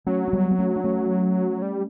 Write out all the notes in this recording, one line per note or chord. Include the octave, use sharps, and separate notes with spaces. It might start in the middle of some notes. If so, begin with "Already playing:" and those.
F#3 A3 C#4
C#4
G3 B3
B3
A3 C#4
D4
A3 C#4
G3